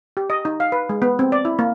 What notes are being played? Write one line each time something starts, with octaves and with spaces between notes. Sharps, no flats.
G4
D#5
D#4
F5
B4
G#3
B3
C4
D5
E4
A#3